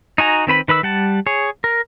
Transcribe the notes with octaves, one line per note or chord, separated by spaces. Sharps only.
D#4 F#4 G#5 A#5
D#3 C4 B4 B5
D#3 B4 B5 E6
G3 F#5 A5
G#4 C#5
A#4